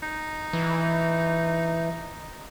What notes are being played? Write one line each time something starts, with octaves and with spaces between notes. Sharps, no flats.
D#4
E3